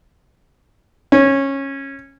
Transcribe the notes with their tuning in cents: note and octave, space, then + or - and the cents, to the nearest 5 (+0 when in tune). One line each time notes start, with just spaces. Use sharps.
C#4 -15